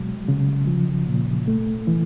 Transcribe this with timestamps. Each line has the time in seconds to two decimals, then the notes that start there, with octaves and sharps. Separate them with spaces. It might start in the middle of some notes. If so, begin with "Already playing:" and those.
Already playing: B2 F#3 G#3
0.28 C#3
0.67 F3
1.07 A#2
1.48 A3
1.87 E3